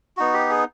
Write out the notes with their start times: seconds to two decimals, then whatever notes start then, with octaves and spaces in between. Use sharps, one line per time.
0.17 B3 D#4 F#4
0.33 G4
0.50 G#4